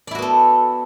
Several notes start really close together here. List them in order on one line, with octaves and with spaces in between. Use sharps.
D5 E4 F#4 B3 A4